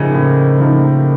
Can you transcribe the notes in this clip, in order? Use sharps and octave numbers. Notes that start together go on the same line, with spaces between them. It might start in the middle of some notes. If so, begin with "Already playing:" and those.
Already playing: A2 C#3 F3 A#3 D#4
A2
F3 A#3 D#4